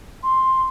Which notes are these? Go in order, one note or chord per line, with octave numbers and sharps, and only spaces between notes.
C6